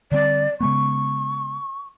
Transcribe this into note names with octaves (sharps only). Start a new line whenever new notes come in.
D3 G3 C4 D5
C#3 G#3 B3 C#6